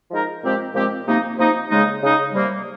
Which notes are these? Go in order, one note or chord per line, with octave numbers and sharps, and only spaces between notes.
F3 G#3 D#4 A#4
A#2 F3 G#3 C4 G4
A#2 F3 G#3 C4 G4
C3 F3 A#3 D#4
C3 F3 A#3 D#4
C#3 G#3 D#4
C#3 G#3 D#4
C3 G3 A#3